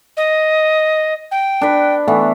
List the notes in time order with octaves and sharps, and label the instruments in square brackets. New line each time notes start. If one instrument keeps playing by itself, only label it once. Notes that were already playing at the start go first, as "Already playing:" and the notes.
[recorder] D#5
G5
[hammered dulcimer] D4 B4
E3 A3 B3